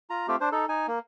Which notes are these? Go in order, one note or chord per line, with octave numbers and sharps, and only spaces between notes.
F4 A#5
A3 C4 F4 G4
D4 C5
D#4 A4
D#4 G#5
A#3